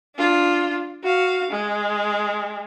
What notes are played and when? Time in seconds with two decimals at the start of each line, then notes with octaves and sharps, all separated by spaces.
0.16 D4 F4
1.03 F#4 F5
1.50 G#3